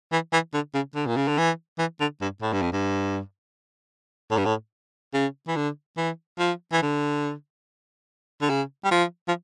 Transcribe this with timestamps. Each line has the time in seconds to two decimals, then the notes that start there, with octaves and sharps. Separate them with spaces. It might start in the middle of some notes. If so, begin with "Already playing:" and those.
0.12 E3
0.33 E3
0.54 D3
0.74 C#3
0.95 D3
1.07 A#2
1.16 C#3
1.28 D3
1.38 E3
1.79 E3
2.00 D3
2.21 G2
2.42 A2
2.52 G2
2.62 F2
2.72 G2
4.31 A2
4.37 G2
4.45 A2
5.13 C#3
5.47 E3
5.56 D3
5.97 E3
6.39 F3
6.72 E3
6.82 D3
8.41 D3
8.49 C#3
8.84 G3
8.91 F3
9.28 F3